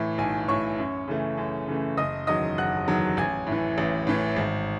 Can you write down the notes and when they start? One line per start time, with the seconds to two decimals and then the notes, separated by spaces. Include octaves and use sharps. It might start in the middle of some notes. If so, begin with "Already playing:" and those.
Already playing: A2 E3
0.18 B1 G#5
0.48 A2 E3 C#5 C#6
0.78 F#2
1.08 C#3 E3 A3
1.38 F#2
1.68 C#3 E3 A3
1.97 F#1 D#5 D#6
2.27 E2 D#3 F#3 D#5 D#6
2.58 F#1 F#5 F#6
2.88 E2 D#3 F#3
3.17 A1 G#5 G#6
3.47 A2
3.52 E3
3.78 A1
4.07 A2 E3
4.36 G#1